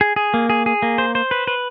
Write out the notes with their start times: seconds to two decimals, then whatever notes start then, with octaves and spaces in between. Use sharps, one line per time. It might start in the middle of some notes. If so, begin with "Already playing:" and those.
0.01 G#4
0.16 G#4
0.34 A#3
0.50 G#4
0.66 G#4
0.82 A#3
0.98 C5
1.15 C5
1.31 B4
1.47 B4